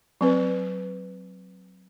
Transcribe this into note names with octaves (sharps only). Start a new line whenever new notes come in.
F#3 C4 B4